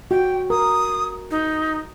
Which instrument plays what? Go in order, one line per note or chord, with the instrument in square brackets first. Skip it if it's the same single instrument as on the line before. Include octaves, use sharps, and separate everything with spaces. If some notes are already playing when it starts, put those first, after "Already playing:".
[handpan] F#4 [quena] G5
[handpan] A#4 [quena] D#6
[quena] D#4